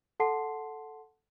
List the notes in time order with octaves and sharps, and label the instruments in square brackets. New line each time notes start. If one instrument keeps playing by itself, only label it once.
[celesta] A4 F#5 A5 C6 C7